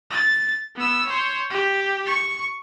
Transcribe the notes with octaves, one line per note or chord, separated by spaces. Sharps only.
A6
B3 E6
C5 C#5
G4
C#6